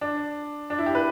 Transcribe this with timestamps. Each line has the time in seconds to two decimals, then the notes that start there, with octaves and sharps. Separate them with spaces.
0.01 D4
0.70 D4
0.79 E4
0.86 G4
0.95 B4